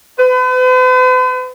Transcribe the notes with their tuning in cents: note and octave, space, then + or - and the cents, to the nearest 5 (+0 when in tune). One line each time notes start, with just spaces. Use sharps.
B4 +45